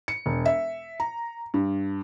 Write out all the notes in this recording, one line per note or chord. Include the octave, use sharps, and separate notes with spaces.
C#7
E1
E5
A#5
G2